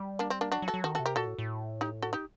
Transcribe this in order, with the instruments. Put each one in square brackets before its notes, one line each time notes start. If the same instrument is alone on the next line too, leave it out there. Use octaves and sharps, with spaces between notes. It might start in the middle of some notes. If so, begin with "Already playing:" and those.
Already playing: [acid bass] G3
[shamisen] A#3 D4
C4
A#3 D4
[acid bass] F#3 [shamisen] D4 F#4
[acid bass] F#3
[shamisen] F#4 A4
[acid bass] F#3
[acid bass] D#3 [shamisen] F#4 A4
[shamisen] F#4 A4
[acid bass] C3
[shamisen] G4 A#4
[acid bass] A#2 [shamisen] F#4 A4
[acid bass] A2
A2
[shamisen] D#4 G4
F#4 A4
D#4 G4